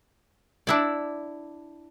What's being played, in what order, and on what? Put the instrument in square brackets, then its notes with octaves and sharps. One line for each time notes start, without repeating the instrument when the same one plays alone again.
[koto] D4 E4 D5